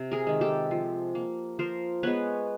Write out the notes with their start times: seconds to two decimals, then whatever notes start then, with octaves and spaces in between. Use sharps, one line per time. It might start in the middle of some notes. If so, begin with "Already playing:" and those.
Already playing: C3
0.11 G#4 A#4
0.27 D#3 G#3
0.41 G4 A4
0.71 F3
1.15 A#3
1.59 F3 A#4 C5
2.03 G#3 B3 B4 C#5